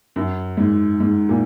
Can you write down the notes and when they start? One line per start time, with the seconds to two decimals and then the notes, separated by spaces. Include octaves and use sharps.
0.16 F#2
0.57 G#2
1.00 G#2
1.29 A#2